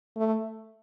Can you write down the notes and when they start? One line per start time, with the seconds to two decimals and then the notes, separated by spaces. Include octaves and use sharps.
0.17 A3